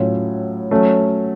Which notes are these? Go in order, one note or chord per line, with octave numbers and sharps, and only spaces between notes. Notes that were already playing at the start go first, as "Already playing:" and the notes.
Already playing: A2 F#3 C#4 F4
F#3 A3 C#4